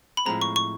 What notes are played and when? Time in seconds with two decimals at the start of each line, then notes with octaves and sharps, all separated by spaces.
0.17 B5
0.26 A2 F3 G#3 C4 A#5
0.41 C#6
0.56 C#6